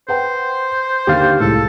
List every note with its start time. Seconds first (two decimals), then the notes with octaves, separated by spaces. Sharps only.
0.09 B4 C5 F#5 G5
1.07 D#2 D3 G4 F5 A6
1.40 C2 A2 G#3 A4